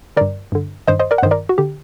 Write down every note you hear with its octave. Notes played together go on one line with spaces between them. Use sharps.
G2 D3 A#4 D5
G2 D3
G2 D#3 C5 D#5
C5 D#5
A#4 D5
F#5
G2 D#3 C5 D#5
A#4 D5
F#4
D3 G4